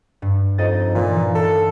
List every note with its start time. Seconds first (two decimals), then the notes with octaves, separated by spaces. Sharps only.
0.22 G2
0.58 F2 D#4 D#5 A6
0.95 A#2 E3
1.16 E3
1.35 A4